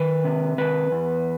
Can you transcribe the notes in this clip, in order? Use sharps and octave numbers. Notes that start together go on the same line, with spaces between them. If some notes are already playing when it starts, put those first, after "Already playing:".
Already playing: D#3 B4
C3
D#3 B4
E2